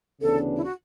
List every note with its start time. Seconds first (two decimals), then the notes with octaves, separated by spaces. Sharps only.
0.21 D2 C#3 E3 B3 D4 A4
0.55 E4
0.63 F#4